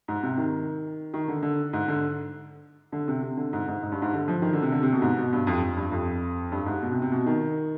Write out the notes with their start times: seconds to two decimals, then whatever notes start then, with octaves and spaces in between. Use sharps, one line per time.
0.08 G#2
0.23 C3
0.38 D#3
1.14 D#3
1.28 D3
1.42 D3
1.73 G#2
1.88 D3
2.92 D3
3.08 C3
3.23 C3
3.37 D3
3.53 G#2
3.68 G#2
3.83 G#2
3.92 G2
4.02 G#2
4.13 D3
4.28 F3
4.42 D#3
4.53 D3
4.63 C3
4.72 D3
4.83 C3
4.92 B2
5.02 G#2
5.18 B2
5.33 G2
5.47 F2
5.62 F2
5.77 G2
5.92 F2
6.52 G2
6.66 G#2
6.82 B2
6.92 C3
7.02 C3
7.12 B2
7.26 D#3